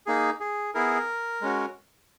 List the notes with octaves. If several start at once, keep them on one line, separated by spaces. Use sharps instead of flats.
A#3 D#4 G#4
G#4
B3 E4 G#4 A#4
G#3 C#4 F#4